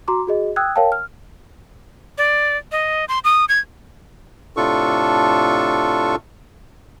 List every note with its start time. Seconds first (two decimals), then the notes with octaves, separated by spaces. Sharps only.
0.08 F#4 A#5 C6 D6
0.27 F#4 G#4 D#5
0.56 G5 D#6 E6 F#6 G#6
0.76 A#4 C#5 F5 G5 A5
0.92 F6
2.18 D5
2.72 D#5
3.08 C6
3.24 D#6
3.49 G#6
4.57 A2 C3 D4 F4 A4 C#6